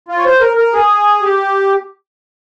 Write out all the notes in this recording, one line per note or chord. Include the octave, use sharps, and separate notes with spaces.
F4
C#5
C5
A#4
A#4
G#4
G4